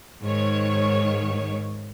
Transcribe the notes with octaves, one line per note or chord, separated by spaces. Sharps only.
G#2 D#3 C#5